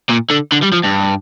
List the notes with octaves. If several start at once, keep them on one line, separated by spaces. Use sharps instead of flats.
A#2
D3
D3
G3
F3
G2